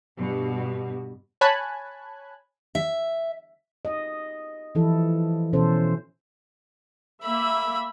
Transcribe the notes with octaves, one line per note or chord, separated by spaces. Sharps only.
G2 B2
C#5 G#5 A5 B5 F#6 G#6
E5
D#5
E3 F3 E4 A4
B2 E3 C#4 A4 C5
A#3 E5 B5